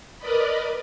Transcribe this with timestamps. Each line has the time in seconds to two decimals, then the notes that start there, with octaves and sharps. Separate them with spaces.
0.18 A#4 B4 D5 D#5 B5